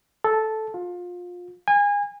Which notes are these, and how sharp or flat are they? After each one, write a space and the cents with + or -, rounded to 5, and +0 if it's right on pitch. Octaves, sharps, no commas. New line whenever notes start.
A4 -5
F4 +25
G#5 -30